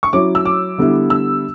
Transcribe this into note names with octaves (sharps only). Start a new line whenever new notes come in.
C#6
F#3 C#4 E4 D6
E6
D6
D3 G3 B3 E4
E6